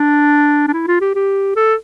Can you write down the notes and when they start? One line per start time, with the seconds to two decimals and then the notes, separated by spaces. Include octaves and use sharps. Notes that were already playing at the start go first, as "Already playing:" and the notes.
Already playing: D4
0.68 D4
0.74 E4
0.87 F4
1.01 G4
1.15 G4
1.56 A4